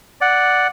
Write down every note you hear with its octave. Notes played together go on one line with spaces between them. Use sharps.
D5 F#5